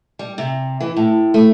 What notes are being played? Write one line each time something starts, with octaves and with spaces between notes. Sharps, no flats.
G3
C3
E3
A2
A3